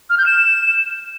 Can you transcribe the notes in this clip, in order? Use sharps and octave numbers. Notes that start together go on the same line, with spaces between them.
F6
G6
E7